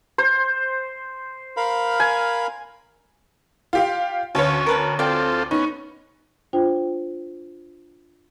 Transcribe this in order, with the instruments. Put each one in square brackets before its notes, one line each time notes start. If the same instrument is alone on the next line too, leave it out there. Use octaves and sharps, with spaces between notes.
[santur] C5
[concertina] A#4 F5 B5
[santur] G#5
[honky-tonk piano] F4 G4 F5
[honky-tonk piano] D2 C#5 [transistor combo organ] C#4 [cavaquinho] B4 F5 A5
[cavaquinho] A#4 B4 A5
[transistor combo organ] C4 F4 A4 [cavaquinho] D5 G5
[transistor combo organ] B3 C#4 [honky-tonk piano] D#4
[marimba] D4 F4 C5 G5